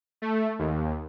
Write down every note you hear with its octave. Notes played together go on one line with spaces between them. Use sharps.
A3
D#2